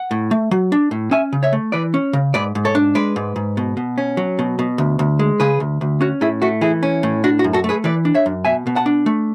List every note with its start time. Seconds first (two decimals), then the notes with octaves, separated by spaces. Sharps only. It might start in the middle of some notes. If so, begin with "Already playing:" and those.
Already playing: F#5
0.11 A2
0.31 A3
0.51 F#3
0.72 D4
0.91 A2
1.11 C#4 E5 G#5
1.33 C#3
1.43 C#5 E5
1.53 A3
1.72 E3 B4 D5
1.94 C#4
2.13 C#3
2.34 G#2 B4 D5
2.55 G#2
2.65 A4 C#5
2.75 D4
2.95 G#3 B4 D5
3.16 G#2
3.36 G#2
3.57 B2
3.77 B2
3.98 C#4
4.17 F#3
4.39 B2
4.59 B2
4.78 D2
4.99 D2
5.19 G#3
5.40 C#3 G#4 B4
5.60 D2
5.81 D2
6.01 C#4 F#4
6.21 A2 E4 G#4
6.42 A3 F#4
6.61 E3 E4 G#4
6.83 C#4
7.03 A2
7.24 D4 F#4
7.39 F#4
7.44 F#2
7.53 F#4 A4
7.64 A3
7.69 G#4 B4
7.84 E3 B4 D5
8.05 D4
8.14 C#5 E5
8.26 F#2
8.45 B2 E5 G#5
8.67 B2
8.76 F#5 A5
8.86 D4
9.06 A3